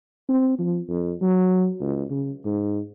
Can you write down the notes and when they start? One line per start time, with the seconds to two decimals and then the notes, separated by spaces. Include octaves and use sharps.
0.29 C4
0.59 F3
0.89 F2
1.21 F#3
1.80 C#2
2.10 C#3
2.45 G#2